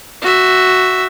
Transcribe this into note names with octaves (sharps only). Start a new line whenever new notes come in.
F#4 E5